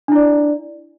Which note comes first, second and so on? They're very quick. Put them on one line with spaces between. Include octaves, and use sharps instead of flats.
D4 E4 D5